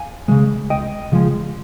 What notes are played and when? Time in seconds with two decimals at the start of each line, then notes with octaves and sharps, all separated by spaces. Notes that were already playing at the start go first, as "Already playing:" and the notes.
Already playing: F5 G#5
0.28 C#3 F3 G#3
0.70 C#2 D#5 G5
1.12 C#3 F3 G#3